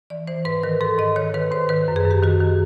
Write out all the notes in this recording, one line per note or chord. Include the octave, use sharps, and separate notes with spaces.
E3 D5
E3 C5
G#2 B4
D#3 A#4
G#2 A4
G#2 D#5
D#3 C#5
D#3 B4
G#2 C5
D#3 B4
F#2
G#4
F#2
G4
D#3 F#4
D#3